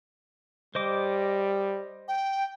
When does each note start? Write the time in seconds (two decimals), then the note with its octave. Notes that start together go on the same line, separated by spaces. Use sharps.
0.75 G3 C5 D#5 D6
2.08 G5